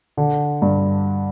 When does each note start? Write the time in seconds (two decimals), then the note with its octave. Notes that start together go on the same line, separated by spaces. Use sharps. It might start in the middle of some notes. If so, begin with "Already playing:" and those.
0.17 D3
0.62 G2